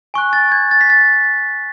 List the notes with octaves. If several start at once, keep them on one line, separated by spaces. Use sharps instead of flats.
G#5 C#6 F#6
A6
G#6
A6
B6
A6